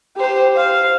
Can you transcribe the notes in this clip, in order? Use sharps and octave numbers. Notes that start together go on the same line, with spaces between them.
G4 C5
C5 F5